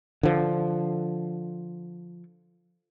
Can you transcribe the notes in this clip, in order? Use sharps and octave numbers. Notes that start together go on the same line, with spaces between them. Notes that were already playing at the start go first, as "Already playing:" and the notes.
D3 F3